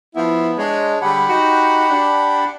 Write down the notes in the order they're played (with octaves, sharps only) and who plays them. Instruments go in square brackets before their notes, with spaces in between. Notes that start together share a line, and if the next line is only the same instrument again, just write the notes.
[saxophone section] F3 E4 [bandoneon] B3
[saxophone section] G#3 [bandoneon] D4 C#5
[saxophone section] D3 G3 G#4 [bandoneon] G4 F#5 B5
[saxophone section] D#4 F#4
D4